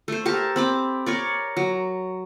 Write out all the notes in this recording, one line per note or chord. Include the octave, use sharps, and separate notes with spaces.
A3 C5
G4 A4 A#4 A5
C4 B5 D6
A#4 C#5 D5
F#3